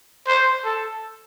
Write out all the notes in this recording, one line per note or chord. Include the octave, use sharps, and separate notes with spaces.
C5
A4